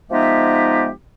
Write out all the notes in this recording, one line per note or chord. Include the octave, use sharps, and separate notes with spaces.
F3 G#3 B3 D#4 G4 E5